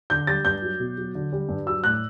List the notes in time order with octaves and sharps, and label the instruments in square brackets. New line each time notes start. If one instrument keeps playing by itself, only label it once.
[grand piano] D3 G6
G3 A6
G2 G6
F#3
B2
F#3
D3
G3
G2
F#3 E6
A2 F#6